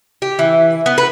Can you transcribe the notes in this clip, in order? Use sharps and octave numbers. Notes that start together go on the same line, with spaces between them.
G4
E3
B3
B4